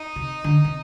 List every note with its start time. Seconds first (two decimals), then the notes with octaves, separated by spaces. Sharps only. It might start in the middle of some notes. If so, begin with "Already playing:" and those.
Already playing: D#4
0.16 C3
0.44 D3
0.64 C3